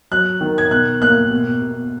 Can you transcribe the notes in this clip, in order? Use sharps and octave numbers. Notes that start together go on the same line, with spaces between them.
F#3 F#6
D#3
G#6
B2 F#6
A#3 F#6
B2
B2